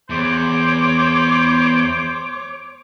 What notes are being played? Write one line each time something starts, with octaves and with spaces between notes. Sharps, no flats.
E2 C5 C#5 D6